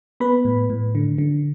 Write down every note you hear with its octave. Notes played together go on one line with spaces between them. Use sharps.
B3 B4 B5
A2
A2
D3
D3